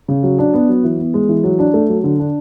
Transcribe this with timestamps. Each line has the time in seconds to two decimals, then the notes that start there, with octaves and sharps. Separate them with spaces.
0.08 C#3
0.23 F#3
0.39 D4
0.54 B3
0.69 F#3
0.84 E3
0.99 B3
1.14 G#3
1.29 E3
1.44 F#3
1.59 D4
1.74 A3
1.89 F#3
2.04 D3
2.19 D4